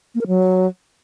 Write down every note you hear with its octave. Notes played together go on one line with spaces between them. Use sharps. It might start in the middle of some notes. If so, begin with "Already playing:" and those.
A#3
A#4
F#3